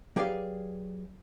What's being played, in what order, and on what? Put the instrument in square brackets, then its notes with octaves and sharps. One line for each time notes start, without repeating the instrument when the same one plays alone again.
[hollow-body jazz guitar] F#3 G4 G#4 B4 D5 F5